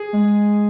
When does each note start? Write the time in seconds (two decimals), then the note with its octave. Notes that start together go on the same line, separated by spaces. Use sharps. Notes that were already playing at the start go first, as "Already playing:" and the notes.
Already playing: G#4
0.13 G#3